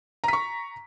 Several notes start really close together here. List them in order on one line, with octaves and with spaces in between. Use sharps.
A#5 B6 C#6